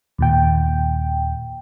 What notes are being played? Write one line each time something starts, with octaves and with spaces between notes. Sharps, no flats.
D#2 A#2 G5